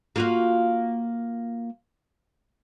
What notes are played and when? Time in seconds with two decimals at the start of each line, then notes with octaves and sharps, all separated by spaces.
0.16 A#3 F4 F#4